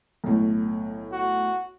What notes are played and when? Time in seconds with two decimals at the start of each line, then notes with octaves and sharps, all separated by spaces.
0.24 B1 A2
1.12 F#4